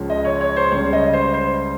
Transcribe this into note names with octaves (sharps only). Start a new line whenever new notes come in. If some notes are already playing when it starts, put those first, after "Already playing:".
Already playing: C#2 C#3 F3
D#5
C#5
C#5
C5
C#2 C#3 G3 C#5
D#5
C5
C5